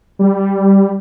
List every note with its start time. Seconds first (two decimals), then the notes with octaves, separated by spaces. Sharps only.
0.19 G3